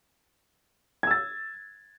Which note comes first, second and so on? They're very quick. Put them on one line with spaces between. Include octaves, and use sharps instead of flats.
G#6 E6 A6